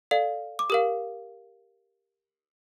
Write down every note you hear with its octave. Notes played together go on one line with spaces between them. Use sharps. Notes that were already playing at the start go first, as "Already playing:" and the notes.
A4 D5 F5
D6
G4 A#4 F5 D#6